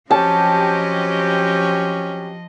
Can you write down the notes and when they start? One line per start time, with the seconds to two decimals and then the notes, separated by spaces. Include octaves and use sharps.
0.11 F3 F#3 C4 C#4 G4 D#5 A5